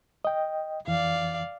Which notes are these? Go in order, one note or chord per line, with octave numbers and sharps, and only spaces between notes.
D#5 G5
F2 E3 D5 F5